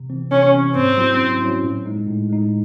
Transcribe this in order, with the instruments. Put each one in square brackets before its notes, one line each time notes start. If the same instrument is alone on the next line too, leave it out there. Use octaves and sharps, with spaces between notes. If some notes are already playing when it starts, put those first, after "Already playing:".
Already playing: [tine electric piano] C3
E3 C4
[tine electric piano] C3 [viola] C#4
[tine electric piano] E3 C4
[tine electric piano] G#2 [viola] C4
[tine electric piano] F#3 C#4 E4
G#2
F#3 C#4 E4
A2
G#3 D#4
A2
G#3 D#4